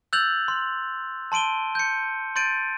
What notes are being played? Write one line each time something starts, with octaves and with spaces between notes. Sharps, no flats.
E6 F#6 G6 A6 F7 F#7
C6
A5 C6 D7 D#7 G7
G6 C#7
C6 G6 A6 D7 D#7